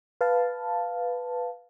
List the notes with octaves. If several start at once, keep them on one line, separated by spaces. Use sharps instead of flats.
B4 F5 A5